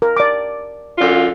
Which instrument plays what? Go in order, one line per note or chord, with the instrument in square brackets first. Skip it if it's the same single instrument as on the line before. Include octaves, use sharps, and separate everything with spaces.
[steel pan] A#4
D5 D6
[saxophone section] F#2 D3 F4